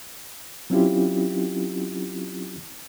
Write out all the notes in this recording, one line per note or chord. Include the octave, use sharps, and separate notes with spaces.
F#3 C4 C#4 E4 F4 G4